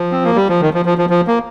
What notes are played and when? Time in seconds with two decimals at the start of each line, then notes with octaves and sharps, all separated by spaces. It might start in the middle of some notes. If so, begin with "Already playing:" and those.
Already playing: F3
0.12 C4
0.25 A#3
0.36 G3
0.49 F3
0.61 D#3
0.74 F3
0.85 F3
0.98 F3
1.10 F3
1.27 A#3